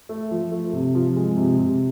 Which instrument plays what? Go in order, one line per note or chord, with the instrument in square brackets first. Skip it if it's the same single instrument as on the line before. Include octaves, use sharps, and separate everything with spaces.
[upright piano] A3
F3
A3
C3
F3
G#3
C3
C3